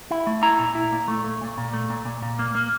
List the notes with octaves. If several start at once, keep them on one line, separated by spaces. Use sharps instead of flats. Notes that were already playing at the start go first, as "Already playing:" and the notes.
E4
A3
E4 A#5
A#2
E4
A#2
A3
A3
A#2
A#2
A3
A#2
A#2
A#2
A#3
A#3